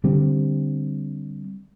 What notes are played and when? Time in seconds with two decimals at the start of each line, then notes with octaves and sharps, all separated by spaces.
0.04 D3 G3 C4